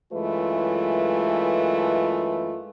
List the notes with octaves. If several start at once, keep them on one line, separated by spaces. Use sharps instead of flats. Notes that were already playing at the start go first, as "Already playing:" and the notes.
F#2 E3 G#3 A3 F4 B4